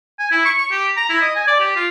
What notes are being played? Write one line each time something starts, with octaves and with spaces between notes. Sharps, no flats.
G#5
E4
C#6
C#6
G4
A#5
E4
D#5
G#5
D5
G4
F4